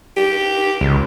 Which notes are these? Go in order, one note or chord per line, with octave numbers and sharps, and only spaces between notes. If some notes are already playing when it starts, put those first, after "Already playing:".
G4
C#2